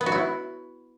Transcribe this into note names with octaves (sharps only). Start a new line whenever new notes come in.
B3
F#4
E4